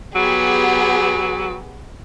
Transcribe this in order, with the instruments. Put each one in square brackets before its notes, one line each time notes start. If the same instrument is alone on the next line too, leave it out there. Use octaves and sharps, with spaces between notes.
[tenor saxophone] F#3 [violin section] B3 G4 G#4